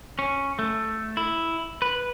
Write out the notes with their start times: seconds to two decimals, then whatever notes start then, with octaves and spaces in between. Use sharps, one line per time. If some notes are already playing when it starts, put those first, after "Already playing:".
0.19 C#4
0.59 A3
1.17 E4
1.82 B4